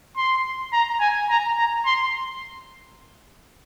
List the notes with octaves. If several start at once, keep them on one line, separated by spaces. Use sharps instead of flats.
C6
A#5
G#5
A#5
A#5
C6